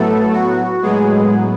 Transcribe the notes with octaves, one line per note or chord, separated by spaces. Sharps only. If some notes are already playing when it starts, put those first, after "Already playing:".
Already playing: A2 F#3 A3 B3 A4
F#4
A2 F#3 G#3 B3 G#4